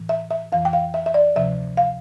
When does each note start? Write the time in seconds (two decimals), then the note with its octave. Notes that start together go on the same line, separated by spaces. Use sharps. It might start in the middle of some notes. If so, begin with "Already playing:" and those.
Already playing: A2 E3
0.09 E5
0.31 E5
0.52 F2 E3 F5
0.65 G5
0.73 F5
0.94 E5
1.06 E5
1.14 D5
1.36 D2 C3 F3 E5
1.77 F5